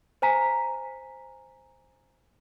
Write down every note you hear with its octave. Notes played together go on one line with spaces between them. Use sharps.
C5 G#5 A#5 B6